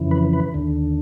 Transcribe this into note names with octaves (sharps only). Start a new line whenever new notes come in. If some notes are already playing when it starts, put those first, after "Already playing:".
Already playing: F2 C#3 E3
B4
B4
D#2 D3